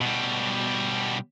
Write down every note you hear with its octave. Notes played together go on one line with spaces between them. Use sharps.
B2 G3